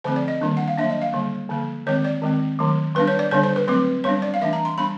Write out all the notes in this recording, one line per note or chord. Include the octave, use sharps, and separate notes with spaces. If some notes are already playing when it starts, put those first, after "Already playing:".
D3 F3 A3 C4 C5
D5
D#5
D#3 G3 A#3 D4
F#5
F5
F#3 A#3 D4 E5
D#5
F5
D3 G3 A#3
D3 F3 A#3
D#3 G#3 C4 C#5
D5
D#3 G#3 C4
D#3 F#3 A3
G3 B3 D4 B4
C#5
D5
D3 G3 B3 D4 C#5
C5
B4
F#3 A3 C4 B4
G3 B3 D4 C#5
D5
F5
E3 A3 D4 E5
A#5
C6
G3 B3 D4 B5